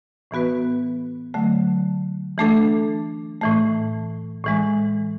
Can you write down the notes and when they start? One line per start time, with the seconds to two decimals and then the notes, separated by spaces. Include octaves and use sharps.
0.31 A2 E3 B3 F#4 B4
1.34 D3 F#3 A3
2.38 E3 A3 D4 A4
3.41 A2 E3 A3
4.44 A2 E3 G#3